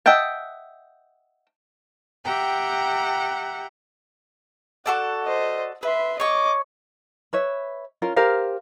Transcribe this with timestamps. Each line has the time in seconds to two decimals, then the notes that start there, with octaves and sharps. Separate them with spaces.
0.06 D#5 E5 F#5 G5 A5
2.24 G4 E5 F#5 G5 A#5
4.86 F#4 A4 D5 F#5
5.24 C5 D#5
5.83 B4 E5 C6
6.20 C#5 D#5 C#6 D6
7.33 B4 C#5 E5
8.02 C#4 F4 A#4
8.16 G4 A#4 C5 F5